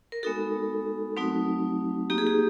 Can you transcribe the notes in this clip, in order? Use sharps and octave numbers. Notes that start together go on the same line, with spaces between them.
A#4
G#3 B3 D#4 F#4 A4
F#3 A3 C4 D#4 F#4
A#3 D#4 F#4 G4
G#4
G4